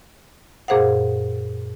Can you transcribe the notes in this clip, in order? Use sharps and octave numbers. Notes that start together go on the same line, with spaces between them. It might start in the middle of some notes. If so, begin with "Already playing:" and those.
F#2 A#2 G#4 C5 F5 F#5